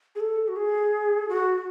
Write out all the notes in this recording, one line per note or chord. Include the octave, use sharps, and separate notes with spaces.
G#4
A4
F#4
G#4
F#4